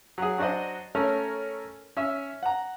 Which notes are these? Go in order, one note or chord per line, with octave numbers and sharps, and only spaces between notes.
F#3 G#4
F#3 D4 F#4 C5 D#5
A3 C#4 A4 A#4 C#5
C#4 E5 E6
F#5 A#5